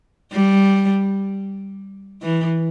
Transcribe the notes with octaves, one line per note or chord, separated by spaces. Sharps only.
G3
E3